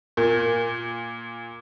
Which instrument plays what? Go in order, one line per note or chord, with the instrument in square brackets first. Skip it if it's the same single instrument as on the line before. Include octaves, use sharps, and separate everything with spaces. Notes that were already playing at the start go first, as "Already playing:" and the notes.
[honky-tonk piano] A#2 [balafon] A#4